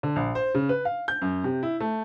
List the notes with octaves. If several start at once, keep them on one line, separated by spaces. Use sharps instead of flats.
D3
A#1
C5
C#3
B4
F5
G6
F#2
C3
E4
A3